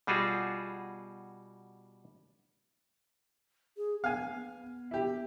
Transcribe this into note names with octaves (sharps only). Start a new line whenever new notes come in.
B2 G3 F4 F#4 G#4
G#4
B3 F5 G#5
B3
E4 G4